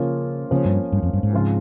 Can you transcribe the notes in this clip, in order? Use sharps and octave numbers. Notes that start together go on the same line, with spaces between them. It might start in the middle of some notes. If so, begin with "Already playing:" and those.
Already playing: C#3 F3 A#3 C#4 F4
C#3 F3 A#3 C#4
G2
G2
F2
G2
G#2
C#3 F3 C4 F4